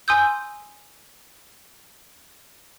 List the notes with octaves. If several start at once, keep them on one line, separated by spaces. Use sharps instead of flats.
G#5 C6 D#6 E6 G6